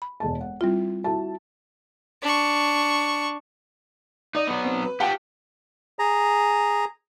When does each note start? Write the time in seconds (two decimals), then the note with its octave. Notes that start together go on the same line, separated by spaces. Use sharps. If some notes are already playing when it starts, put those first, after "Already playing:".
0.02 B5
0.20 E1 G#3 A5
0.41 F#5
0.61 G3 C4 E4 F4
1.04 E4 F#4 A5
2.22 D4 C#6
4.35 D#4 D5
4.47 F#3 B3
4.65 C4
4.82 B4
5.00 F4 G4 F#5 G5 A5
5.99 G#4 A#5